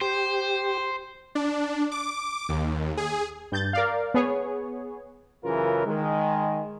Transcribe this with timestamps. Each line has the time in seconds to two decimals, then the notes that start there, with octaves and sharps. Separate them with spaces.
0.01 G4 C5
1.35 D4
1.92 D6
2.49 D#2
2.97 G#4
3.52 G2 G6 A6
3.73 A#4 D5 F5
4.14 B3 G#4 C#5
5.44 F#2 C#3 E3 F4 A#4
5.86 D#3 G#3